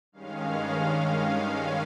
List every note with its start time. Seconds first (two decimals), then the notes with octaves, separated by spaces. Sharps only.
0.12 G2 D#3 G#3 C#4 F5